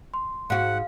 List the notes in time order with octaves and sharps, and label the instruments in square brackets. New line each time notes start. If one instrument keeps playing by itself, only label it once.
[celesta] C6
[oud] G#2 F#4 [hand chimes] F5 [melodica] F#5